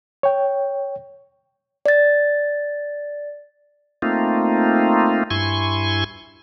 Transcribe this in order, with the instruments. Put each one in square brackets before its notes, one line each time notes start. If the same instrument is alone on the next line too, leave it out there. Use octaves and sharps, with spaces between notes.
[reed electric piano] C#5 G5
[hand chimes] D5 A6
[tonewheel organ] A3 A#3 C4 D#4 F4
G2 E4 G#5 C6 C#6